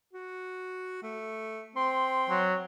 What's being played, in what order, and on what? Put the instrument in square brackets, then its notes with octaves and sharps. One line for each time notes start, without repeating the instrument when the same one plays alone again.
[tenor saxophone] F#4
A3
[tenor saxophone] C4 [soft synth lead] C6
[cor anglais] F#3